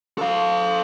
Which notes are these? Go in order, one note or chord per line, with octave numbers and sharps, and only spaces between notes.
A4 F5